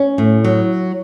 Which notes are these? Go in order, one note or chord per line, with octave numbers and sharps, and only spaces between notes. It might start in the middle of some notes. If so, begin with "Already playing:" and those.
Already playing: C#4
A2
F#3